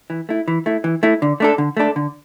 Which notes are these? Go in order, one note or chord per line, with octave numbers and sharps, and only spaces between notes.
E3
A3 E4
E3
A3 E4
E3
A3 E4
D3
A3 D4 A4
D3
A3 D4 A4
D3